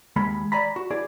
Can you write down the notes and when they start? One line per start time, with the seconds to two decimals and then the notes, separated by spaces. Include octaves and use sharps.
0.16 D#2 G#3 B5
0.52 D5 G#5 A#5 B5
0.76 F#4
0.91 E4 G#4 D5